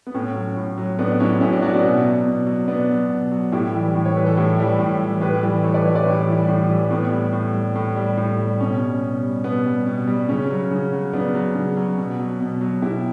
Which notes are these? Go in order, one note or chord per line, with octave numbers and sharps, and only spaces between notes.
B3
A2 C#4
F#3
A2
F#3
A2 B3 D4
D4
F#3 C#4 E4
A2 C#4 E4
D4 F#4
F#3 D4 F#4
B3 D4
B2
F#3
B2
F#3
B2 B3 D4
F#3
B2
F#3
A2 E4 G4
E3 G3
A2
C#5
E3 G3 B4
A4
A2 E4 G4
E3 G3
A2
E3 G3
A2 G4 B4
E3 G3
A2 A4 C#5
B4 D5
E3 G3 C#5 E5
B4 D5
A2 E4 G4
E3 G3
A2
E3 G3
A2 B3
G3
A2
G3
A2
G3
A2
G3
B2 C#4
G3
B2
G3
B2 B3
G3
B2
G3
C#3 C#4
F#3
C#3
F#3
C#3 B3 D4
F#3
C#3
F#3
B2
F#3
B2
F#3
B2 E4 G4